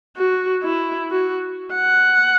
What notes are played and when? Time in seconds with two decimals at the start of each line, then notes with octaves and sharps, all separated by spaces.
0.17 F#4
0.63 E4
1.11 F#4
1.74 F#5